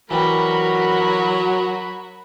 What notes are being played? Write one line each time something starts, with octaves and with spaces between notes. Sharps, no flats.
E3 F#3 G3 F#4 A#4 B5